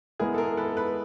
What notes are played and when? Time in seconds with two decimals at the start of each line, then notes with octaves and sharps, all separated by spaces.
0.20 G#3 B3 E4 G#4 A#4
0.34 A4
0.38 G#4 A#4
0.57 A4 B4
0.77 A4 B4